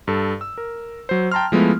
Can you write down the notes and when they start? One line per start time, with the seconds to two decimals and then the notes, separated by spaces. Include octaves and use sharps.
0.08 G2 A4
0.41 E6
0.58 A#4
1.09 F#3 C5
1.32 G5 A5 A#5 C6 F6
1.52 F3 G#3 A3 B3 E4